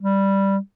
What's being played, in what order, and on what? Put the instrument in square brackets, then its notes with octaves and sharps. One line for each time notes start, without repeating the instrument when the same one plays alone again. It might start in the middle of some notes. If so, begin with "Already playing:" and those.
[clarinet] G3